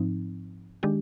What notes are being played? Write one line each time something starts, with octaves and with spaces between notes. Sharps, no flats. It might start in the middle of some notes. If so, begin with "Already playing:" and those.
Already playing: G#2 F3 C4 D#4
D#3 G#3 D4 G4